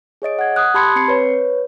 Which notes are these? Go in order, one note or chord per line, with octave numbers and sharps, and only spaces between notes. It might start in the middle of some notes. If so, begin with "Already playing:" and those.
G#4 C#5 D#5 D7
F#5 G#6
D#6 F#6
G4 A5 B5 C6 G#6 C#7
C4 C7 C#7
B4 C#5